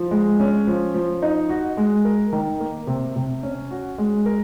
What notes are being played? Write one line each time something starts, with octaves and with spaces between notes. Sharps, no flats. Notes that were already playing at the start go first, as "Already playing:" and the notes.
Already playing: F3
G#3
C#4
F3
F3
D#4
F#4
G#3
A#4
D#3
A#3
C3
C3
C#4
F#4
G#3
A#4